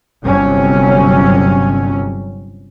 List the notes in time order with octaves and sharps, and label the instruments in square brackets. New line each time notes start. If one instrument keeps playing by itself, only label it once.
[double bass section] G1 C3 F#3 C#4